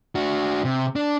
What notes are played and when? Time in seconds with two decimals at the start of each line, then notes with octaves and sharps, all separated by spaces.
0.15 D4 F#4
0.64 C3
0.96 D4